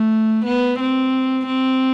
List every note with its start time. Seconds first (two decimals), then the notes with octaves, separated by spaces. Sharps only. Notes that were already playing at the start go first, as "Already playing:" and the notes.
Already playing: A3
0.46 B3
0.80 C4
1.47 C4